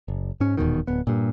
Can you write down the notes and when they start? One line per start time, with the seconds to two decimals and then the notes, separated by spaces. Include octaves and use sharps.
0.08 F#1
0.40 G#2 C#4
0.57 D#1 E2 B2 D#3
0.87 D1 B3
1.07 G2 A#2